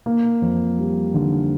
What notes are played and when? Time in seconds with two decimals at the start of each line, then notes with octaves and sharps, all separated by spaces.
0.06 A#3
0.42 F2
0.79 G3
1.14 D3